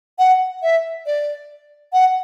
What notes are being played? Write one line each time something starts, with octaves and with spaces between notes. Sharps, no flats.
F#5
E5
D5
F#5